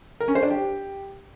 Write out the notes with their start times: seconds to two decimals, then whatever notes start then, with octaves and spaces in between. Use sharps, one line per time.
0.20 A#4
0.28 C#4
0.35 C5
0.43 D4
0.50 G4